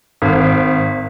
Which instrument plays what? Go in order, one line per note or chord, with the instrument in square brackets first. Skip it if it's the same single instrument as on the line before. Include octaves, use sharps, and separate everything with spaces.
[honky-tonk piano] G#1